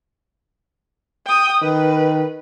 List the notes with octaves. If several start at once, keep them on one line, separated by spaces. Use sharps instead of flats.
G5 D#6
D#3 B4